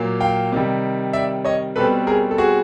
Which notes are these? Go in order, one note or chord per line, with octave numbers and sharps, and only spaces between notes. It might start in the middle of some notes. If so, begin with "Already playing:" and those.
Already playing: A#2 F#3 A#3
F5 G5
C3 D#3 G3
D5 E5
C#5 D#5
B2 G3 C4 A4 B4
G#4 A#4
A4
F#4 G#4